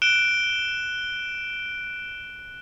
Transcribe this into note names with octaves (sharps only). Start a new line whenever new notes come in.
F#6 D7 E7 G7